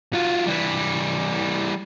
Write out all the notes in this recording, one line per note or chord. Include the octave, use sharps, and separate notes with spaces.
F#3 F4
E3 G3